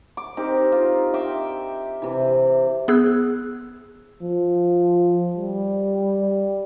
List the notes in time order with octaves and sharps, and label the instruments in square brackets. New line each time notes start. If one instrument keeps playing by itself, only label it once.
[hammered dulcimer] D6
C4 D#4 G4 A#4
F4
E5 G5 D6
C3 E3
[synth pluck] B3 G#4 E6 F#6
[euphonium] F3
G3